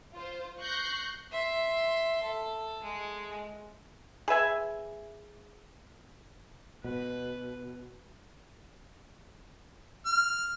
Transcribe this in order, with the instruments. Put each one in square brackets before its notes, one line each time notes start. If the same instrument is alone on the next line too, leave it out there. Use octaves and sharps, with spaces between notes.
[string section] F4 C5
C#6 F#6 G6 A#6 C7
[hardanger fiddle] E5 C6
A4
G#3
[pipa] G#4 B4 E5 G#5
[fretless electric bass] B2 [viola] B4
[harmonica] F6